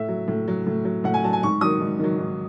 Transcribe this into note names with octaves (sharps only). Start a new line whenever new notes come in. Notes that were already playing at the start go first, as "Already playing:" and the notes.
Already playing: A2 E5
F#3
A2
F#3
A2
F#3
A2 F#5
G#5
F#3 A5
G#5
G#2 C#6
D#3 F#3 D#6
G#2
D#3 F#3
G#2